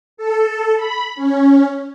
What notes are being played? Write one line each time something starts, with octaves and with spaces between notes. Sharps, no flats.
A4
B5
C#4